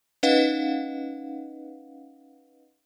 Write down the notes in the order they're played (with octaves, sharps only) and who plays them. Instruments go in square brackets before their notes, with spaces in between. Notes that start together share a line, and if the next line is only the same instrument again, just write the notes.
[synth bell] C#4 D#4 B4 D#5 F5 F#5